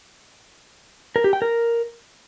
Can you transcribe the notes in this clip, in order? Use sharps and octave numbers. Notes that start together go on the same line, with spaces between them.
A#4
G4
G5
A#4